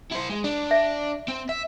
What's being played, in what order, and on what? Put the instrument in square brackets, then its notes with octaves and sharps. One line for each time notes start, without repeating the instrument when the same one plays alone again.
[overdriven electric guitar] E4 C5
G#3
D4
[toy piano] E5
[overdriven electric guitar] C4
E5